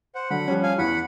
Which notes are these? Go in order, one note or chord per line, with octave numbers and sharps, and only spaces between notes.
C5 F#5
D3 F#3 F#5 B5
F3 G3 C#4
F5 G#5
E2 F#5 B5